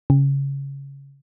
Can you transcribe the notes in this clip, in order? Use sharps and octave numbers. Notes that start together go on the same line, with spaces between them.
C#3